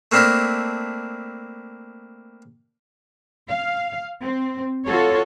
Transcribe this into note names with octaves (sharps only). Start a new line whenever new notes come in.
A3 A#3 C4 D4 E4 A#4
F5
C4
F4 F#4 A4 C#5